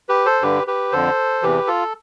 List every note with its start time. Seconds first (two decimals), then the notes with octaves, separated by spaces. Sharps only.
0.09 G4 B4
0.26 A4 C5
0.42 G2 D3 G4 B4
0.67 G4 B4
0.92 F2 D3 A4 C5
1.42 E2 C3 E3 G4 B4
1.67 F4 A4